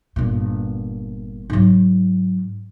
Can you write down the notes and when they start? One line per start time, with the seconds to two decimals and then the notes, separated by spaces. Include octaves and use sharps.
0.16 G1 A#2
1.50 G#2 F#3